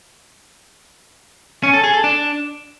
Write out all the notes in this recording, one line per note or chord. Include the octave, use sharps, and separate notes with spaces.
C#4
A4
G#4
A4
D4